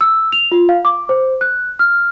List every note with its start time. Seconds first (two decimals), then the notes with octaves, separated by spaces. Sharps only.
0.01 E6
0.32 F7
0.52 F4
0.69 F5
0.85 D6
1.09 C5
1.41 F#6
1.79 F6